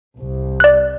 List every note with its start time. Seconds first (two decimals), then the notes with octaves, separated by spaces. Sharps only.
0.17 C2
0.60 D5 F#6